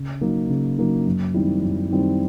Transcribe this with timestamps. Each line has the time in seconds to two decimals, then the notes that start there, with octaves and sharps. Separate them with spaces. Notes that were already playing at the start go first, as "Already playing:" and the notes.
Already playing: C#3
0.21 F#3 A#3 D#4
0.49 C#3
0.78 F#3 A#3 D#4
1.06 F#2
1.34 D#3 G3 C4 E4
1.62 F#2
1.91 D#3 G3 C4 E4